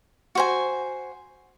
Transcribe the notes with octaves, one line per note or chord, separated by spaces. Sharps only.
F#4 C5 G#5